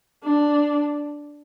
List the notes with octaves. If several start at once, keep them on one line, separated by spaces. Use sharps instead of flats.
D4